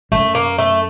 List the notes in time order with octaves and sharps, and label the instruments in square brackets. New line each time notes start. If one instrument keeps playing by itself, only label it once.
[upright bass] F#2 [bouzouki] A3
[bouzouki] A#3
A3